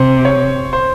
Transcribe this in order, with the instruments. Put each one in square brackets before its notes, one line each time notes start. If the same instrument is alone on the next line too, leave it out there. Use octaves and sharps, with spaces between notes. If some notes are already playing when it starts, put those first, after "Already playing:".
Already playing: [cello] C3 [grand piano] C5
[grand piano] C#5
C5